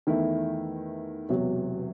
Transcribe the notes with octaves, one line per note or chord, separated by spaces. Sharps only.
E2 D#3 A3 E4
E1 E2 C3 F#3